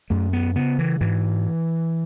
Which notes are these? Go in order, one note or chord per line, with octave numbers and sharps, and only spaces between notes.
F#2 A3
B3
C#3 B3
E3
G#2 E3